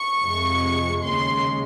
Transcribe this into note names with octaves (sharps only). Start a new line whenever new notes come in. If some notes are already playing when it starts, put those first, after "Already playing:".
Already playing: C#6
F2 C3 F3 G#3
D#2 C#3 G#3 C6